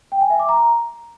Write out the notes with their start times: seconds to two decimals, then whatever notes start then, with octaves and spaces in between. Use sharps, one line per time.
0.12 G5
0.21 G#5
0.30 E5
0.39 D6
0.49 A#5